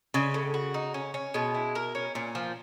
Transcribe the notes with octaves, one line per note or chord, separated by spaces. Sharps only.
C#3 G#3
A2
F#4
D#4
C#4
C#4
B2 G#3
E4
A#4
C#4
A#2 C#4
F3